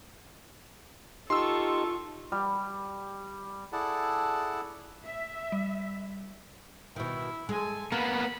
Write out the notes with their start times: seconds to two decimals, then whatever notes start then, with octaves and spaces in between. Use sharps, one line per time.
1.30 D#4 F4 G4 A4 C6 C#6 E6
2.32 G3
3.73 E4 G#4 A4 D5 F#5 A5
5.07 E5
5.52 G3
6.96 B2 D#3 E4
7.49 G#3 A4 G#5
7.92 A#3 B3 A#4 B5